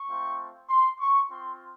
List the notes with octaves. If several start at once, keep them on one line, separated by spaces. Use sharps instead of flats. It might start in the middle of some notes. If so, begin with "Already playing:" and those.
Already playing: C#6
A3 C4 F4
C6
C#6
C4 F4 C6